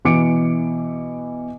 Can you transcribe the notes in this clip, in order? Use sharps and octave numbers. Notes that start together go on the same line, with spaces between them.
B2 E3 D6 C#7 D7